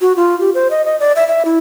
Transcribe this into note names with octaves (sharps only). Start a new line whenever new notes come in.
F#4
F4
G4
C5
D#5
D#5
D5
E5
E5
E4